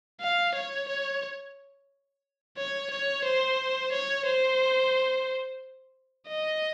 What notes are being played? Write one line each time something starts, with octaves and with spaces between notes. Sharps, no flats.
F5
C#5
C#5
C#5
C#5
C5
C#5
C5
D#5